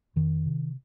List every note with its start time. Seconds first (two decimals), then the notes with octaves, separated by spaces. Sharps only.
0.16 F2 D#3
0.46 C3